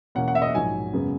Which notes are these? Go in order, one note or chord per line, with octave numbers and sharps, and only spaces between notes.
E2 B2 A#3 C#4 F#5
F#5
E5
D#5
A#1 G#2 F#3 G#5
F#2 C#3 G#3 B3